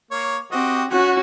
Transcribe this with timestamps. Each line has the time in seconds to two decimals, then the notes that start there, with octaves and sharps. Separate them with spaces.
0.11 A#3 C#5
0.51 C4 F#4 G4 D#5
0.91 C#4 F#4 F#5